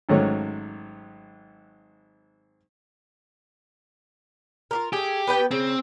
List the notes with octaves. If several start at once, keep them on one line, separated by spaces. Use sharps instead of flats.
G#1 G#2 F#3 A3 C#4
F4 G4 A#4
A3 G4 G#4
B3 B4 G5
C#3 C4